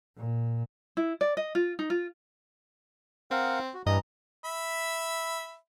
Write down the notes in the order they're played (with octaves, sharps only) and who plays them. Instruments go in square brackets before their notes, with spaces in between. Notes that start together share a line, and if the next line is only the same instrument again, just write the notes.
[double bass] A#2
[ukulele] E4
D5
D#5
F4
D#4
F4
[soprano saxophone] C4 [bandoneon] A#4 F5 F#5
[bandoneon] F#4
[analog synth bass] G2 [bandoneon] E3 A#5 [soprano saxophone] D#5
[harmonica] E5 B5